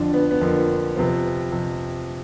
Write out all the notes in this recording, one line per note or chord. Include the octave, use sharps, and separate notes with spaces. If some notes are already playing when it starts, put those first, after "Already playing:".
Already playing: F2 D3 F3 D4
B3
B3
F2 D3 F3 A#3
F2 C3 F3 B3
F2 C3 F3